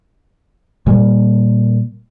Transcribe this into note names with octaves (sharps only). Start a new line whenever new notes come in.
A#2 G3 A#3